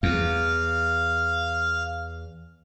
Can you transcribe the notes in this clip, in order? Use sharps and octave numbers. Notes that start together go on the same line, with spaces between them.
E2 F5